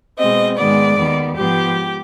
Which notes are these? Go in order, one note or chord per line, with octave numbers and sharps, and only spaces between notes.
B2 G#3 C4 D#5
G#2 D#3 G#3 B3 D5
D#2 D#3 B3
G#2 F3 G#3 B3 G4